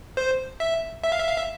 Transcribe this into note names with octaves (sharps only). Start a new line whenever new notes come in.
C5
E5
E5
F5
E5
F5
E5